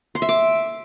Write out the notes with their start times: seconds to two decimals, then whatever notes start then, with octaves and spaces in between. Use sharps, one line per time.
0.15 C6
0.22 E5
0.29 D6